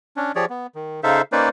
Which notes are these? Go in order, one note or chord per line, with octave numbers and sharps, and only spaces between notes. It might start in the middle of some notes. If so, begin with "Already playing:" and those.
C#4 D4
F3 G4 G#4 C#5 D5
B3
D#3
C#3 D#4 A4 C5 E5 F5
A#3 C#4 D#4 B4 C5 D5